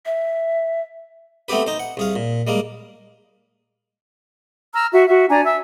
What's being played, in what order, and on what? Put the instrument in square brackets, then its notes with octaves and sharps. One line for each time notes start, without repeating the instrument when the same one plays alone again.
[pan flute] E5
[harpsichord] A3 B3 C4 G4 B4
D#4 C5
F#5
C2 G#4 F5
A#2
G3 G#3 A#3
[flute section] A#5 E6 F6
F#4 E5
F#4 E5
D4 D5 G#5 A#5
E5 E6